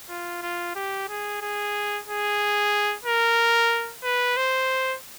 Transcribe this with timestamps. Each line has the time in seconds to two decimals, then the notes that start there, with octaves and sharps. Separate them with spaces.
0.09 F4
0.42 F4
0.75 G4
1.08 G#4
1.41 G#4
2.07 G#4
3.05 A#4
4.04 B4
4.37 C5